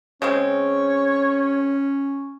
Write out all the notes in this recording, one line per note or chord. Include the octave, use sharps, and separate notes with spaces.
C#3 G#3 C4 C#4 C#5